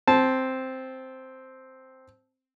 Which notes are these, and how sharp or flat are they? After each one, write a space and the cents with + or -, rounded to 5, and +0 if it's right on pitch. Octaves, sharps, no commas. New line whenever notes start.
C4 +0 A5 -15